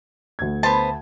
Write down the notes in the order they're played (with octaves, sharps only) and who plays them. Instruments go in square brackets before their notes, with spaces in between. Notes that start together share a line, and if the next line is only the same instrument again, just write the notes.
[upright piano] D2 G#6
[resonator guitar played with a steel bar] B3 C5 [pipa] A5